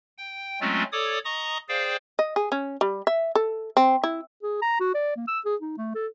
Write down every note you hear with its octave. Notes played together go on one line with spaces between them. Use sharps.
G5
F#3 G#3 A3 C4 C#4 F4
A4 C#5 D5 D6 D#6
D#5 A#5 C#6 D#6
G#4 C5 D5 F5 G5
D#5
G#4
C#4
G3
E5
A4
C4
E4
G#4
A#5
F#4
D5
A#3
E6
G#4
D#4
A3
A4